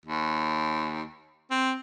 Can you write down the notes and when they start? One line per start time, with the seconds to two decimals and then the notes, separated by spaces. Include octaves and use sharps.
0.05 D#2
1.51 C4